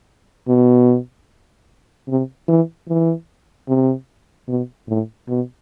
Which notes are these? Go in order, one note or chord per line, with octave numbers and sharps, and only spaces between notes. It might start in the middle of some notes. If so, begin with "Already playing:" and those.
B2
C3
E3
E3
C3
B2
A2
B2